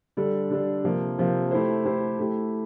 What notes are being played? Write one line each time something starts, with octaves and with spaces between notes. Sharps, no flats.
D3 G3 D4 A4
D3 G3 D4 A4
C3 F3 A#3
C3 F3 A#3
A3 E4 G4 C5
A3 E4 G4 C5
A3 E4 G4